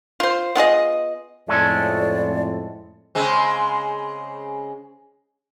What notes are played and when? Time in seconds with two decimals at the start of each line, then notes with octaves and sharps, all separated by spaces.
0.20 F4 C5
0.55 B3 F4 G#4 D#5
1.48 F2 A2 G#3 C#4 A4 D5
3.15 C#3 G#3 C4